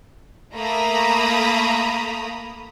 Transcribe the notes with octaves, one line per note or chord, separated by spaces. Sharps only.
A3 A#3 A#5 B5 D#6